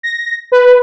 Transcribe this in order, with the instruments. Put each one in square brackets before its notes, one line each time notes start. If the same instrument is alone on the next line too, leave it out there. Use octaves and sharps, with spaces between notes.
[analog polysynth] A#6
B4